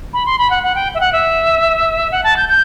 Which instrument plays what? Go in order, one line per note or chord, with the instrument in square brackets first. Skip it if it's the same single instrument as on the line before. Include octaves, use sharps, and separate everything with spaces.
[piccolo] B5
C6
B5
F#5
F#5
G5
E5
F#5
E5
F#5
A5
G6
G6